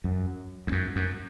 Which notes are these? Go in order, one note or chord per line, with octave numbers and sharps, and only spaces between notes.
F#2
E2
F#2
F#2